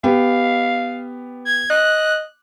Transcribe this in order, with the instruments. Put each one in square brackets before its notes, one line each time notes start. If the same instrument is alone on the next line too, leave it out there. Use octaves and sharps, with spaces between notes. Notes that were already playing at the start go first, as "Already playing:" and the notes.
[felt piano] B3 G4 [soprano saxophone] F5
[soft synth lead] G#6
[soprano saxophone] D#5 [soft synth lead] F#6